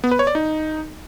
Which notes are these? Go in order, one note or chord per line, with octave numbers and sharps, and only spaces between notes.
B3
B4
C#5
D5
D#4